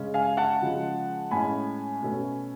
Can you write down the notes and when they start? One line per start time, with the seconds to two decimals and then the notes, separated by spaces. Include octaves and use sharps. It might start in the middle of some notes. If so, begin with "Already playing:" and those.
Already playing: C#3 G#3 C#4
0.14 F5 G#5
0.37 F#5 A5
0.62 C#3 F3 G#3
1.31 A2 G#3 C#4 G#5 B5
2.02 B2 A3 C#4